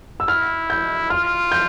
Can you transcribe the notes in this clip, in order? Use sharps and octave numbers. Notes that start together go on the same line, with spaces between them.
E6
E4 F6
G6
F4 F6
G6